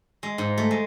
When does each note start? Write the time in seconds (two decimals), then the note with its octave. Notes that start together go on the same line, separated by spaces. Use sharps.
0.23 G#3
0.38 G#2
0.58 A3
0.71 G#3